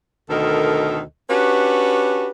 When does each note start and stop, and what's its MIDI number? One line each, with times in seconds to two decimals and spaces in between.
0.30 1.01 38
0.30 1.01 47
0.30 1.01 51
0.30 1.01 69
0.30 1.01 70
0.30 1.01 75
1.30 2.30 61
1.30 2.30 62
1.30 2.30 66
1.30 2.30 67
1.30 2.30 71